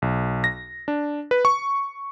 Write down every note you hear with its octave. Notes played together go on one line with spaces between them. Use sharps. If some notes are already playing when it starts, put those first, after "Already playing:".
B1
A#6
D4
B4
C#6